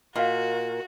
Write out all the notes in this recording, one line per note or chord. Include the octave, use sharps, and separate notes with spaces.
A#2 F#4 A#4 D#5 F5